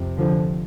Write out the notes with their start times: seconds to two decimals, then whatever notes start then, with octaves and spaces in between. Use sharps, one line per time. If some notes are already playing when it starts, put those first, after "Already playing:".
Already playing: F2 C3
0.17 D3 F3